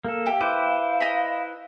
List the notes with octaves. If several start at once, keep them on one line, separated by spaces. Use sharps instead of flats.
A#3 A4
G4 E5 F5
E4 B4 C5 D6
D#5 A#5 B5